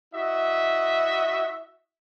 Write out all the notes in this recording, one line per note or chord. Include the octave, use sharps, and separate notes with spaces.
E4 F#4 D#5 E5